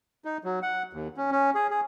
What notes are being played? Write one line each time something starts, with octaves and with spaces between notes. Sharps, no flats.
D#4
F#3
F#5
D#2
C#4
C#4
G#4
G#4